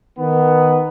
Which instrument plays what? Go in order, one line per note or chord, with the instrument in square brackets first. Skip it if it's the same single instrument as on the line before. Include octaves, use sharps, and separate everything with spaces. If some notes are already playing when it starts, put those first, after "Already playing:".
[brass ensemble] D#3 B3